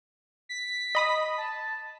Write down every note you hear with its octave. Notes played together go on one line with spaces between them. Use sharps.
B6
D#5 B5 D#6
A5